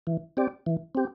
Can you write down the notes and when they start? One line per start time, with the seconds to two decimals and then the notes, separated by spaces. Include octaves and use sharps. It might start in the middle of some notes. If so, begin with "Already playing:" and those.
0.07 E3
0.37 C4 G4 D5
0.66 E3
0.95 C4 G4